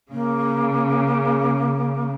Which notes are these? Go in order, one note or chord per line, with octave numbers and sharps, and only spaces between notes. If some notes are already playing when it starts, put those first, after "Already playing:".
C#3 A#3